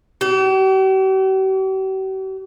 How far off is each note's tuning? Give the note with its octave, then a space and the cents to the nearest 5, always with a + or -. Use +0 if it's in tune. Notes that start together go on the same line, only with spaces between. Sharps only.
G4 -45